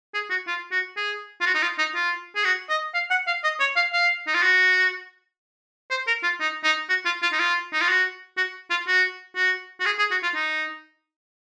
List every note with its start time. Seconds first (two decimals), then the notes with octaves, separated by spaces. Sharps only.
0.14 G#4
0.30 F#4
0.47 F4
0.72 F#4
0.97 G#4
1.41 F4
1.46 F#4
1.55 D#4
1.62 F4
1.78 D#4
1.95 F4
2.36 G#4
2.44 F#4
2.69 D#5
2.94 F5
3.10 F#5
3.27 F5
3.44 D#5
3.60 C#5
3.76 F5
3.93 F5
4.27 D#4
4.34 F4
4.42 F#4
5.91 C5
6.07 A#4
6.23 F4
6.40 D#4
6.64 D#4
6.89 F#4
7.05 F4
7.22 F4
7.32 D#4
7.39 F4
7.73 D#4
7.81 F4
7.89 F#4
8.37 F#4
8.70 F4
8.88 F#4
9.36 F#4
9.80 F#4
9.86 G#4
9.99 G#4
10.11 F#4
10.23 F4
10.35 D#4